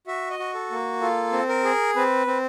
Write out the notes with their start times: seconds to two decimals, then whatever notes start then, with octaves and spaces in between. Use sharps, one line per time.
0.07 F#4 E5
0.30 D#5
0.39 F#4
0.54 A4
0.71 A#3
1.01 F4 A4
1.32 C4
1.49 A#4
1.64 G#4
1.96 C4 B4
2.27 C4